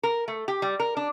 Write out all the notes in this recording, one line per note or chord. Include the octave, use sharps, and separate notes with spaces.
A#4
A3
G4
G3
A#4
D4